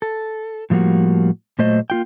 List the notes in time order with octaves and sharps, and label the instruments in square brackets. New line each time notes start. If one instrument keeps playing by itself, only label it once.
[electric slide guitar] A4
A2 F3 G3 A#3 F#4
A#2 F#3 A3 C5 D#5
A#3 F4 G5